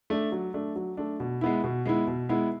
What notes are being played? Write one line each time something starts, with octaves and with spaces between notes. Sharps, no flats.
A3 D4
F#3
A3 D4
F#3
A3 D4
B2
G#3 B3 E4
B2
G#3 B3 E4
B2
G#3 B3 E4